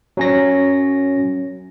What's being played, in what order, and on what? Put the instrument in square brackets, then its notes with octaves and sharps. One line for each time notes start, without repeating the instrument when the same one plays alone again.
[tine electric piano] F#3 C#4 A#6